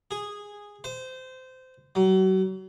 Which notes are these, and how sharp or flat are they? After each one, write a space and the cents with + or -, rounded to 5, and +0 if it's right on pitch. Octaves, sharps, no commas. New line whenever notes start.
G#4 -10
C5 -20
F#3 +35